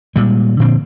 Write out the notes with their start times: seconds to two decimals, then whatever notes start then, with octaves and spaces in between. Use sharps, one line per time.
0.16 A#2 G3 G#3
0.60 A#2 D3 F3 C4